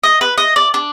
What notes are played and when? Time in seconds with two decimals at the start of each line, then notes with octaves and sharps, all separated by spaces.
0.03 D#5
0.21 B4
0.38 D#5
0.56 D5
0.74 D4